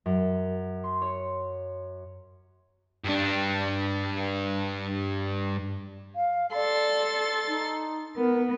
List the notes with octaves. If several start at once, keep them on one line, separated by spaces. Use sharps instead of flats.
F#2
C6
C#5
G2 D4
F5
A4 D5 C6 A6
D#4
B3 A#4